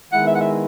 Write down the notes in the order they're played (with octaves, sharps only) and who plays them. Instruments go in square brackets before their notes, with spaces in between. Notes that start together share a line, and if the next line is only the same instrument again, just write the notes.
[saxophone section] D#3 G#3 B3 E4 F#5
E5
F#5
E5